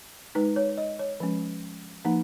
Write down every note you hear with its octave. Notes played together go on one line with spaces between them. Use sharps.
G#3 D#4 B4
C#5
D#5
C#5
F3 G#3 C#4
F3 A#3 D#4